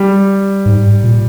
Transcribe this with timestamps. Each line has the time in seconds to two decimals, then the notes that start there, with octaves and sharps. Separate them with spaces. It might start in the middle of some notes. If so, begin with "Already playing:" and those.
Already playing: G3
0.66 G#2
1.04 A#2